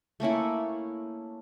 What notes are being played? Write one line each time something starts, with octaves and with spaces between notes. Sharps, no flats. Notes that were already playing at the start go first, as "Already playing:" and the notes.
A3 A#3 C#4 E4